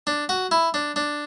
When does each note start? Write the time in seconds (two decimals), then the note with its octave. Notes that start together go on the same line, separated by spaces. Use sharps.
0.07 D4
0.29 F#4
0.51 E4
0.74 D4
0.96 D4